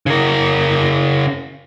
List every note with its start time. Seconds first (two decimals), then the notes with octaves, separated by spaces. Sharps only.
0.06 C#3 A#4